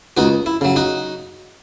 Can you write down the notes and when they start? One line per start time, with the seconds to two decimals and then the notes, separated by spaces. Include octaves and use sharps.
0.17 C#2 D#4 F#4
0.46 E4
0.61 C#3 F#3
0.76 D#4 F#4